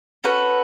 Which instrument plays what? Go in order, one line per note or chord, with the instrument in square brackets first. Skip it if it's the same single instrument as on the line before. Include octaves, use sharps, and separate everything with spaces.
[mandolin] C#4 F#4 A4 B4